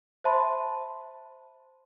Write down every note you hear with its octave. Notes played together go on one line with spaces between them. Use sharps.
C5 E5 A5 B5 C6